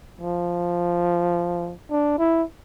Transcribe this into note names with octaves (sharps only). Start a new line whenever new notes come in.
F3
D4
E4